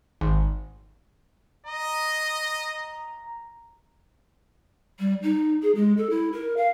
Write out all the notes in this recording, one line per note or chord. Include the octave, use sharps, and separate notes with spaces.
G#1
D#5 A#5
G3
D#4
G#4
G#3
A4
E4
A#4
F5